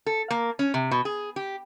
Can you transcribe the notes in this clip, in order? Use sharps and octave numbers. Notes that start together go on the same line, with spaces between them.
A4
A#3
C#4
C3
B2
G#4
G4